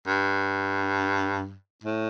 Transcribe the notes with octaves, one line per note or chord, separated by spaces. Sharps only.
G2
A2